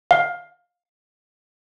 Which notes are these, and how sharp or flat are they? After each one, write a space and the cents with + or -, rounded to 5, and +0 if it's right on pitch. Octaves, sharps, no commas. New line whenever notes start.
F5 +20